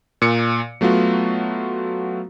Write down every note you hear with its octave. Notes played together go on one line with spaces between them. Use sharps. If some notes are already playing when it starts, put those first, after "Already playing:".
A#2 C#7
F#3 A3 B3 F4 F#4